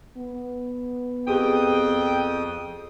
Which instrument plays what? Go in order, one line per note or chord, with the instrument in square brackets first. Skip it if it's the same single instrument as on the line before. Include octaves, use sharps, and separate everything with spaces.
[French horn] B3
[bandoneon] F2 D#6 [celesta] G4 G#4 [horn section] G5